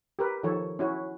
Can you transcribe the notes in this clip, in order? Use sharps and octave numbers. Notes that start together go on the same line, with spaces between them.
G4 A#4 B4
D#3 F3 A4 C#5
C#4 E4 F#4 C#5